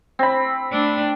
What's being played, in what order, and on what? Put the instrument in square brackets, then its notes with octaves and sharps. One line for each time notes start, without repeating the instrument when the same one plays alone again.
[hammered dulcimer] C4 B5
[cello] A3 D4